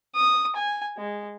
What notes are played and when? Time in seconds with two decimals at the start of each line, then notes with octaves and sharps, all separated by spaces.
0.16 D#6
0.56 G#5
0.98 G#3